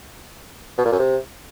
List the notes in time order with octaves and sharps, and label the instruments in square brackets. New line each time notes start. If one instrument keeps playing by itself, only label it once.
[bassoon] B2
A#2
F#2
C3